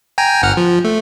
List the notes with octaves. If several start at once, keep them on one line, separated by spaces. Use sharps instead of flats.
G5 G#5 A#5
G1 F#5 F6
F3
A3